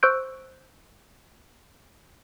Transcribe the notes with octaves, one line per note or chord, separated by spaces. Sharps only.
C5 C#6 E6 F#6 G6 D7